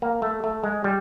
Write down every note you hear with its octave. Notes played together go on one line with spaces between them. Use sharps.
A#3
A3
A3
G#3
G3